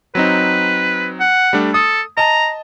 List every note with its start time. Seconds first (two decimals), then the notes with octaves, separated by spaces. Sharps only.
0.15 F#3 C4 D#4 B4
1.20 F#5
1.53 G3 A3 D4
1.74 A4 D#6
2.18 D#5 A5 A#5